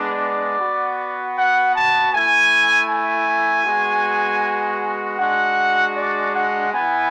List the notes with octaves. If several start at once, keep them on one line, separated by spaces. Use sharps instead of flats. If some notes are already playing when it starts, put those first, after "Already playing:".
Already playing: G#3 B3 D4 D5
B3 F#4
F#5
A5
A3 E4 G#5
G#5
G#3 B3 F#4
G#3 D4 F#4 F#5
D5
F#5
B3 E4 G#5